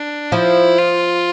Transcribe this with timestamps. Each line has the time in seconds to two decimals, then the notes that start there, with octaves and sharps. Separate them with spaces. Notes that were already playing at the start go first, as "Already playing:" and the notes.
Already playing: D4
0.32 F3 E4
0.79 F4